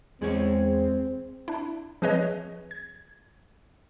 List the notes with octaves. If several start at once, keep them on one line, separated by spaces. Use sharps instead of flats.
E2 G#3 C4 G#4 C#5
D4 E4
F3 C4 G#4 B4 C#5 D#5
G#6